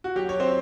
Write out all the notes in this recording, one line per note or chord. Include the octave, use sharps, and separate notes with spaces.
F#4
F#3 G4
C#5
C4 C5